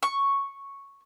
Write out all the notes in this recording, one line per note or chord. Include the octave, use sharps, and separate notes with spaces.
C#6